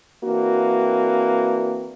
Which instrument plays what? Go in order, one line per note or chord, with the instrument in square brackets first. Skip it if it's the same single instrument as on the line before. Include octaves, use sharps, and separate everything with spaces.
[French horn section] E3 A#3 C4 D4 F#4